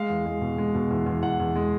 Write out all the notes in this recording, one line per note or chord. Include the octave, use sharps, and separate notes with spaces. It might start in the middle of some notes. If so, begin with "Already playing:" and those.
Already playing: G#3 F5
E2
G#3
B2
G#3
B2
E2
E2
E2 F#5
E2
G#3